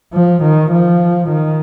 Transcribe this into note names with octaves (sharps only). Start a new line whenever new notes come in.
F3
D#3
F3
D#3